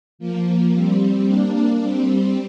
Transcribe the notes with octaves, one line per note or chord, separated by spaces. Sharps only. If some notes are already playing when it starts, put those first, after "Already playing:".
F3 A#3
G3 C4
A#3 D4
G3 C4